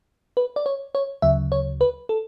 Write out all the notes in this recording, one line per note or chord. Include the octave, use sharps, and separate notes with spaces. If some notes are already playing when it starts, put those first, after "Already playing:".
B4
D5
C#5
C#5
D2 C#3 F#3 E5
C#5
B4
A4